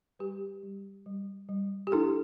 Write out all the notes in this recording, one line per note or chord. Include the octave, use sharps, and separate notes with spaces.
G3 G4 B4
G3
G3
G3
G4
D4 E4 A4